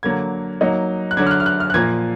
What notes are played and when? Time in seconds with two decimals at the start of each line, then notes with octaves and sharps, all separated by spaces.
0.03 D3 F#3 A#3 G#6
0.61 F#3 A#3 D#4
1.11 F#6
1.17 D3 F#3 D4 G#6
1.27 F6
1.31 F#6
1.40 F6
1.46 F#6
1.60 F6
1.70 F#6
1.74 A#2 F3 A#3 G#6